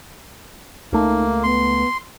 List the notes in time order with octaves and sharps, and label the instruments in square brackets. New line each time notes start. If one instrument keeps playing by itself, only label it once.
[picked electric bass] C#2 A3 [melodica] A#3 [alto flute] D#4
[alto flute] B3 [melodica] C6